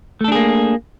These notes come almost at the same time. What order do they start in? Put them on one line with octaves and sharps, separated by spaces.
A3 A4 D4 G#4 A#3